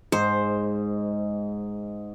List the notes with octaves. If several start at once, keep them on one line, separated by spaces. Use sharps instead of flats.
G#2 C5